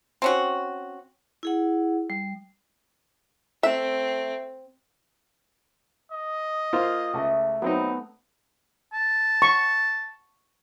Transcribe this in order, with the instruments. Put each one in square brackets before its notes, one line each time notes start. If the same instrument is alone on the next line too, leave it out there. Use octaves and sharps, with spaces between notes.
[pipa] C4 C#4 F#4
[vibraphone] E4 G#4 F#5
G3
[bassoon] A3 [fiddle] C4 [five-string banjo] E5
[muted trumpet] D#5
[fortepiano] A#3 F4 C5
[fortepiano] C#2 [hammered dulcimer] A3 A4
[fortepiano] F#3 C4 D#4 [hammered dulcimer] B3
[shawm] A5
[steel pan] C#6